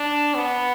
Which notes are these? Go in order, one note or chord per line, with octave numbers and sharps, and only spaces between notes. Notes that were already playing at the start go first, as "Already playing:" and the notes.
Already playing: D4
B3